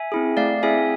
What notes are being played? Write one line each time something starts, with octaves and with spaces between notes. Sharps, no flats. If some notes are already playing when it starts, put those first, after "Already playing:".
Already playing: E5 G#5
C4 E4 G#4
A3 D5 F5
C4 E4 G#4 E5 G#5